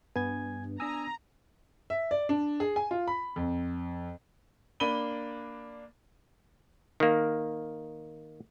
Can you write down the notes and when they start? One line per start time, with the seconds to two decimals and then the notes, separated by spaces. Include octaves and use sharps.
0.16 G2 B3 G#5 G#6
0.80 D4 G#5 A#5 D#6 E6
1.90 E5
2.11 D5
2.29 D4
2.60 G#4
2.76 G#5
2.91 F4
3.08 B5
3.36 F2
4.80 A#3 D4 B5 D#7 G7
7.00 D#3 A#3